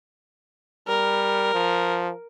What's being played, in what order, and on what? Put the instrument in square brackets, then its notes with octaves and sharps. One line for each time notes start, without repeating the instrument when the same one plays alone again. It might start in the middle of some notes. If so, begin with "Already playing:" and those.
[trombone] G3 [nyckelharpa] A#4
[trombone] F3